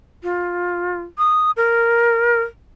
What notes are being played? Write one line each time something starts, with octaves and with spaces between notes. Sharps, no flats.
F4
D#6
A#4